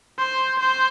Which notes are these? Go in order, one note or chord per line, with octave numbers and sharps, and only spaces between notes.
C5
C5